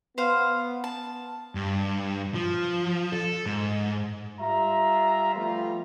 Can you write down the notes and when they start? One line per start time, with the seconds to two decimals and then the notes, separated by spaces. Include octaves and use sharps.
0.18 B3 C5 F5
0.84 A5
1.55 G2
2.34 F3
3.12 A4
3.46 G#2
4.39 G3 F4 E5 A#5
5.35 F3 G3 A3 B3 F4